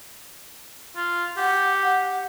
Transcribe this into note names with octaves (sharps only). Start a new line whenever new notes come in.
F4
G4 F#5